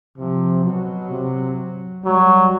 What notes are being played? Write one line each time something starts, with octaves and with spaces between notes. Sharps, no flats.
C3 F3
B2 F#3
C3
F#3 G3